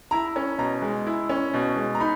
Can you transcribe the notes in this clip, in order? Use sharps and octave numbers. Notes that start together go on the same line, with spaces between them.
E4 A#5
C#4
B2 A#5
G#3
E4
C#4
B2
G#3
A#5
D#4 B5